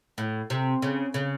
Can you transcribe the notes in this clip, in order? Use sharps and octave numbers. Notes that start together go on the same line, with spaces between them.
A2
C3
C#3
C#3